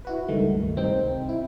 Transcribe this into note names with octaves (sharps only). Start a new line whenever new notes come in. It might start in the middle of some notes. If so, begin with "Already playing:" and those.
E4 F#4 B4
C#2 G2 D#3 A3
C2 C3 C4 D#4 G5
E4